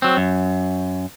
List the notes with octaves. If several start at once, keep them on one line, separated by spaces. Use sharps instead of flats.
F#3 C4
F#2